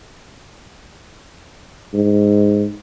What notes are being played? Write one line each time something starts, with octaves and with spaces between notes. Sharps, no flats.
G#2